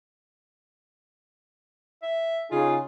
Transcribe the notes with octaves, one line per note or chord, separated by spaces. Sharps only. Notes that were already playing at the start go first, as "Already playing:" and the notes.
E5
C#3 D#4 F4 G#4